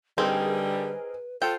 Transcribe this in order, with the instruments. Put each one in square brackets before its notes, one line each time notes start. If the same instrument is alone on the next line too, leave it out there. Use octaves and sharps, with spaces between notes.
[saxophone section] D3 G3 [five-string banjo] C4 D#4 [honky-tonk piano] G#4 A#4 [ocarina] B4
[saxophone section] F4 A4 C5 [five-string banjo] G5